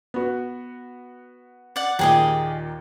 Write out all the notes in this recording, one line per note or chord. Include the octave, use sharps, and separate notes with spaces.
B3 F#4
D5 F#5
D#2 A#2 G4 G#4 D#5